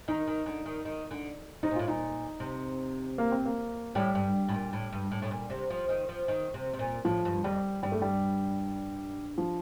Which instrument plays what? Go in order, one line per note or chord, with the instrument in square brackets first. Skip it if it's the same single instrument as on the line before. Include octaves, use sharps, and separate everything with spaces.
[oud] D#3 [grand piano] D#4
[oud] D#3
D3
D#3
D#3
D3
[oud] C3 [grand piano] D#4
[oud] A#2
[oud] A2 [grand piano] F4
[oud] A#2 [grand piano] D#4
[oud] C3
[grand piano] A#3
C4
A#3
[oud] A2 [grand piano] G3
[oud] G2
A2
A#2
A2
G2
A2
A2
A#2
C3
F3
D#3
F3
D#3
C3
C3
A#2
[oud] A2 [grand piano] F3
[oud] G2
[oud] F2 [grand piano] G3
[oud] G2 [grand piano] G3
[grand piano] A3
G3
F3